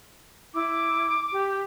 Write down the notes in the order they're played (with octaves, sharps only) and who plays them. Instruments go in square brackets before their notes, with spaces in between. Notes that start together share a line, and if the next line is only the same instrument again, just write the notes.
[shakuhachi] E4 [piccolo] D6
[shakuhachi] G4